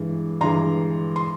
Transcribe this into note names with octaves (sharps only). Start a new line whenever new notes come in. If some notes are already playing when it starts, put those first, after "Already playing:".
Already playing: G2 E3 G#3
G2 E3 G#3 A#5 C6
C6